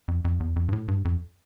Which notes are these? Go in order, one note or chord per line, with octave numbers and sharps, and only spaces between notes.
F2
F2
E2
F2
G2
A2
G2
F2